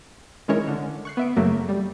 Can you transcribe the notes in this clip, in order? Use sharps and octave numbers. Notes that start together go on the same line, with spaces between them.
D#3 G#3 C#4 E4 A#4 C#5
D3
C#6 F#6 C7
B3 E5 D7
F#2 C#3 F#3 A3 A#3
G3